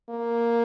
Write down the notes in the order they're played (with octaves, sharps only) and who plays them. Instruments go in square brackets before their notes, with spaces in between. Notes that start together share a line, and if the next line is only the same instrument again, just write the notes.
[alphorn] A#3